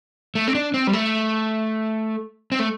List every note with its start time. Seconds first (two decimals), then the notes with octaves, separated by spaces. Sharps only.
0.35 A3
0.48 C4
0.55 D4
0.74 C4
0.87 G3
0.93 A3
2.52 C4
2.59 A3